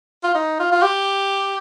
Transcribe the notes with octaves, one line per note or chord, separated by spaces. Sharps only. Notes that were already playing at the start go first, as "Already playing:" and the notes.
F4
D#4
F4
F4
G4